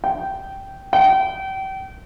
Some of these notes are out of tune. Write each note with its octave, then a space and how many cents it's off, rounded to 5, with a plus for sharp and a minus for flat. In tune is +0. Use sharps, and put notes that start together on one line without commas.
G5 -15
G5 -35